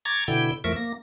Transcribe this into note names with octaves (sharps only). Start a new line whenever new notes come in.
A#5 C#6 D6 G#6 A6
B2 D3 E4 G5
E2 F3 A3 A#4 E5 C#6
A#3 A#6